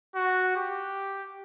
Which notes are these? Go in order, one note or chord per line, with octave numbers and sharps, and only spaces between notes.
F#4
G4